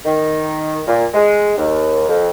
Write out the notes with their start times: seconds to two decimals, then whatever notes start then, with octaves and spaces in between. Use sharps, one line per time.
0.05 D#3
0.87 A#2
1.14 G#3
1.57 D#2
2.08 F2